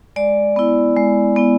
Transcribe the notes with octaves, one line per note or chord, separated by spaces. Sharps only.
G#3 D5
B3 E4
G#3
B3 E4